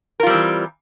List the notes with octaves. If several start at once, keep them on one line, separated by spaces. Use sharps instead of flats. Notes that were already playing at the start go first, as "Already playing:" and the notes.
E3 G3 C4 F4 A#4